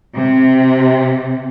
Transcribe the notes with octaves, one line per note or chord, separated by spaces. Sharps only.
C3